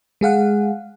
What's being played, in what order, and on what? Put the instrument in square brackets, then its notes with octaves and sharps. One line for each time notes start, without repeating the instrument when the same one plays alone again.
[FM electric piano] G#3 G#4 F5 F#5